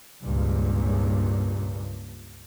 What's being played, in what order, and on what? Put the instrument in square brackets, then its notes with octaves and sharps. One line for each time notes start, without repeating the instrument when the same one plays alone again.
[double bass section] C#2 G2 A#2